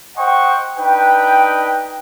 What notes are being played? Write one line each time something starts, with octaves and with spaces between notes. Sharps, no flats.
C5 D#5 F#5 G5 C#6
D4 D#4 B4 G5